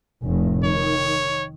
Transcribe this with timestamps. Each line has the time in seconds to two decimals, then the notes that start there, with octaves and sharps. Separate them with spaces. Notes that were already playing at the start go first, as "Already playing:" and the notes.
0.24 F1 A2
0.64 D#3 C#5